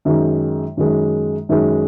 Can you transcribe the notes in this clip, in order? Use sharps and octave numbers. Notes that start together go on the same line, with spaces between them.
F#2 D#3 G#3
F#2 D#3 G#3
F#2 D#3 G#3